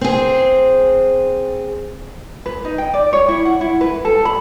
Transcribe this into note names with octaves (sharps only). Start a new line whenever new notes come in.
C4 G#4
B4
D#4
G5
D5
C#5
E4
F#5
E4
B4
A4
B5